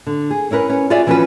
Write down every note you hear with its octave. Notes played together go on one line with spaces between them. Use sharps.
D3
G#4
C#4 E4 A#4 B4
C#4
F4 F#4 G#4 D5 E5
E3 F3 C#4 F4 F#4 B4